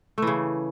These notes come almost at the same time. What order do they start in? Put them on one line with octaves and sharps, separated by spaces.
A3 E3 C#3